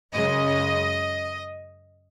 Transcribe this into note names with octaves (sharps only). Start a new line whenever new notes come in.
F#2 C#3 G#3 D#5